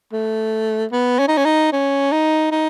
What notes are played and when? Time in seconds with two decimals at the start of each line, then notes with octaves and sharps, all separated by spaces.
0.13 A3
0.92 B3
1.19 C#4
1.28 D#4
1.37 C#4
1.45 D#4
1.72 C#4
2.11 D#4
2.51 D#4